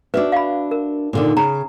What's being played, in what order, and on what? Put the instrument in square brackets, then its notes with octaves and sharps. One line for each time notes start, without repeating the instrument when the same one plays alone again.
[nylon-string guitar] D4 F#4 E5 [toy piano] B4
[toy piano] F5 B5
A#4
[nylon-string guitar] A#2 D3 D#3
[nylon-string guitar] C#3 [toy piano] A#5